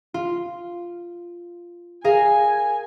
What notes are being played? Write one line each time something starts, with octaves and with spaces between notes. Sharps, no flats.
F4
G#4 A#4 F5 G#5